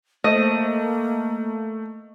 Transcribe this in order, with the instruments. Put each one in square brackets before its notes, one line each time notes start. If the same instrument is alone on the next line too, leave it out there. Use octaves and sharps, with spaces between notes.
[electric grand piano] A3 [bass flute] A#3 [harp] D#5